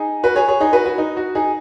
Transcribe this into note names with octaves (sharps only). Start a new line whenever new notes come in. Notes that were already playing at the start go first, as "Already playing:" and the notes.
Already playing: D#4 G#4
F#4 B4
G#4 C#5
G#4 C#5
D#4 G#4
F#4 B4
F#4
D#4
F#4
D#4 G#4